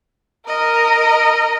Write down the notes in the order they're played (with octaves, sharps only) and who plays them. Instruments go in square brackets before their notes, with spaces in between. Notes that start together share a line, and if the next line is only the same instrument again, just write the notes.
[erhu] A#4 [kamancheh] D#5